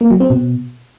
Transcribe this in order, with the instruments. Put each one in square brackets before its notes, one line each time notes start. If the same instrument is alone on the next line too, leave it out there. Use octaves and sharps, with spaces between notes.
[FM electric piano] A#3
F#3
C4
B2